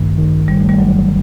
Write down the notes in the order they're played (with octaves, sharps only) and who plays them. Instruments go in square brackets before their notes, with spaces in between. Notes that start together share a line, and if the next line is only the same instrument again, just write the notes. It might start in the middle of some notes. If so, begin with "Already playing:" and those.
Already playing: [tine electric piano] A1 G2 D#3 [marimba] A3
[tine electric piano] D#3
[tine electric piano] G1 [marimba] G3
[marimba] A3
G3
[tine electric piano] G1 [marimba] F#3